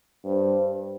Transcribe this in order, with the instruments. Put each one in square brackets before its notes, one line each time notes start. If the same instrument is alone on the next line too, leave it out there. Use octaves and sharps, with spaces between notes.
[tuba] G2 [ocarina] C5